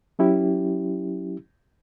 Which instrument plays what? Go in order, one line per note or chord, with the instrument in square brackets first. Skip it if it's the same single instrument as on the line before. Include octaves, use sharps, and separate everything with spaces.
[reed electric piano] F#3 C#4 E4 G4